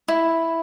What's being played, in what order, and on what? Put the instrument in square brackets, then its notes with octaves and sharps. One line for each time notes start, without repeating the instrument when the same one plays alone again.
[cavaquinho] E4